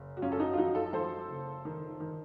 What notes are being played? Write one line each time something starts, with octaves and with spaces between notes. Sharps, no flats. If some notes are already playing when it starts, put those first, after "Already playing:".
Already playing: F#1
F#4
F#2 C#4 F4
A4
D#4 F#4
F4
F3 D#4 F#4
F4 A4
F3 A4 C5
F#1
D#3
D#3